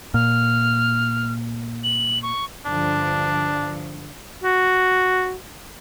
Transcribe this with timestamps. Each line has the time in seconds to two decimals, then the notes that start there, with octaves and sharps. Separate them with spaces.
0.14 A#2 F6
1.84 F#7
2.23 C#6
2.66 G2 D3 F3 D4
4.44 F#4